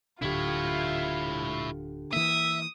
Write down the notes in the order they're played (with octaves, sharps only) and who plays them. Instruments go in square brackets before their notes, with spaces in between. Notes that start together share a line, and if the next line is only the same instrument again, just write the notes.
[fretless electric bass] D1 [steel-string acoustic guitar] D3 G4 [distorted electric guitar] E4 C#5 [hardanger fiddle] F4
[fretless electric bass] E3 A#3 [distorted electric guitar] E5 [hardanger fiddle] D#6